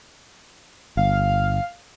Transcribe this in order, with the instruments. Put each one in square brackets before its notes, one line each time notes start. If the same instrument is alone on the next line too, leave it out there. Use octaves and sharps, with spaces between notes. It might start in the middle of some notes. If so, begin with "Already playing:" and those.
[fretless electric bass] G1 [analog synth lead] F5